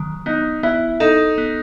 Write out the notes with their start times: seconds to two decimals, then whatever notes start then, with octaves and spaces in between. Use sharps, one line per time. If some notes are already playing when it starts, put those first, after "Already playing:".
Already playing: D#3 F#3
0.26 B3 D#4
0.63 B3 E4
1.00 D#4 A4
1.38 B3